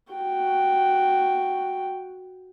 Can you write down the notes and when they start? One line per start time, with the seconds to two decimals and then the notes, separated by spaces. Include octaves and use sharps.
0.14 F#4 G5